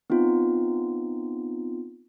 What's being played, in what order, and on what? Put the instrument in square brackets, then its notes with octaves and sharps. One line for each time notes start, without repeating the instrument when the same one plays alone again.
[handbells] B3 C4 D#4 F4